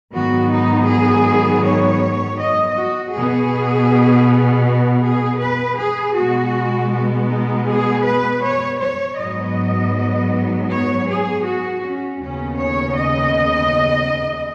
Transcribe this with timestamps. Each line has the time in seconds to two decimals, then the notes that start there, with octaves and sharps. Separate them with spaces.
0.14 G#2 D#3 F#3 B3 F#4
0.51 D#4
0.90 G#4
1.65 C#5
2.40 D#5
2.77 F#4
3.15 B2 B3 G#4
4.67 F#4
5.03 G#4
5.42 B4
5.79 G#4
6.17 B2 G#3 B3 F#4
6.92 F#4
7.30 D#4
7.68 G#4
8.05 B4
8.44 C#5
8.81 C#5
9.18 G#2 F#3 B3 D#5
10.70 C#5
11.07 G#4
11.45 F#4
11.82 C#4
12.20 D#2 C#3 B3 C#4
12.58 C#5
12.96 D#5